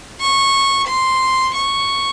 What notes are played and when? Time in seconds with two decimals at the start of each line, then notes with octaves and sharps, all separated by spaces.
0.21 C#6
0.88 C6
1.56 C#6